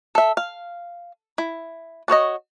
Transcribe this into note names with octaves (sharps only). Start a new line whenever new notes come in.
A4 E5
F5
E4
D4 F#4 C#5 D#5